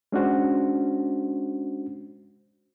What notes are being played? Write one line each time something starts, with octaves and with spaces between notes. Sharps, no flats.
G#3 C#4 D4 F#4 C5